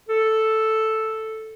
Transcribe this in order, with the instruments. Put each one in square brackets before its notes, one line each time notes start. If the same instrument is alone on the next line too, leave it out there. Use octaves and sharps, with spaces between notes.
[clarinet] A4